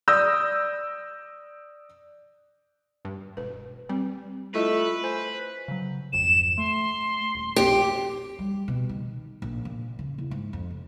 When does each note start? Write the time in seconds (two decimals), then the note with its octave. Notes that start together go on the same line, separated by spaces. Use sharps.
0.08 D5 D#6 E6 G6 A#6
3.05 G2
3.37 E1 B4
3.89 G3 C4
4.55 A3 E4 F4 B4 D#5
5.04 C5 G#5
5.68 C#3 F#3
6.13 G#1 F2 E7
6.58 A3 C6
7.35 D#1
7.56 E1 A#1 G4
8.39 G3
8.68 B2
8.89 D#3
9.42 A#1
9.65 A#2
9.99 C#3
10.18 E2
10.31 G#2
10.53 F2
10.71 F1